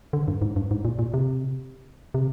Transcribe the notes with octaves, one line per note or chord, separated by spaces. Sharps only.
D3
G2
G#2
G2
G#2
A#2
A#2
C3
C3